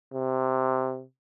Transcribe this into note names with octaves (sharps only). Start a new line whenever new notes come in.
C3